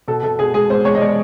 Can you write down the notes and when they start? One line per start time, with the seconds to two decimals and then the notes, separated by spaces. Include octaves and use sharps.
0.08 B2 A4
0.23 B2 A4
0.39 B2 G#4
0.54 G#3 G#4
0.70 G#3 C5
0.85 G#3 C#5
0.95 D#5
1.01 G#3 D5